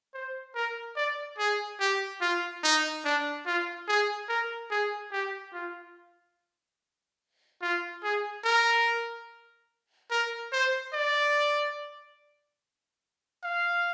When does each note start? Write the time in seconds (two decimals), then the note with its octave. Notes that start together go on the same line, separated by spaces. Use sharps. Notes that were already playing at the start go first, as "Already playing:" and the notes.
0.14 C5
0.55 A#4
0.96 D5
1.38 G#4
1.80 G4
2.21 F4
2.63 D#4
3.05 D4
3.46 F4
3.88 G#4
4.29 A#4
4.71 G#4
5.12 G4
5.53 F4
7.62 F4
8.03 G#4
8.44 A#4
10.11 A#4
10.52 C5
10.93 D5
13.43 F5